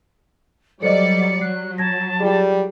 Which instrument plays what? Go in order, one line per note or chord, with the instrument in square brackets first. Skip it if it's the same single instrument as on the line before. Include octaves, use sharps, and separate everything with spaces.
[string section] F#3 G3 D5 [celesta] A4 C5 D#5 [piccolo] C#7
[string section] F#3 [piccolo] F#6 [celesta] C7
[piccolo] A5 [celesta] G#6 A#6
[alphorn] G3 [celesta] F4 G#4